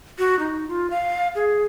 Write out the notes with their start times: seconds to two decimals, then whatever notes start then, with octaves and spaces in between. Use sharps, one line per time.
0.19 F#4
0.39 D#4
0.68 F4
0.90 F5
1.35 G#4